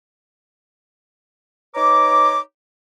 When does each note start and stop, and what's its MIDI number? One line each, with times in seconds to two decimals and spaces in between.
1.74 2.39 63
1.74 2.39 71
1.74 2.39 73
1.74 2.39 82
1.74 2.39 86